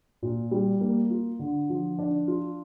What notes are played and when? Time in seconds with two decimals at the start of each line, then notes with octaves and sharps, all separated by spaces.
0.22 A#2
0.51 G3
0.81 A#3
1.10 F4
1.39 D3
1.70 F3
1.99 D4
2.28 F4